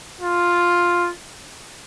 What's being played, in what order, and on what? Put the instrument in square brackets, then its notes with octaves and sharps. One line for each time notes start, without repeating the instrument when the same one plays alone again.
[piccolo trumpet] F4